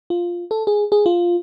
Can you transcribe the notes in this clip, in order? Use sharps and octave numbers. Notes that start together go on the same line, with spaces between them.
F4
A4
G#4
G#4
F4